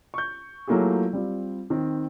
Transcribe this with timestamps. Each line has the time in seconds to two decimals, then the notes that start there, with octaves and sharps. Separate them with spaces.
0.14 C#6 G6
0.67 F#3 A3 A#3 E4 F4 G#4
1.13 G3 C4 F4
1.70 D#3 C4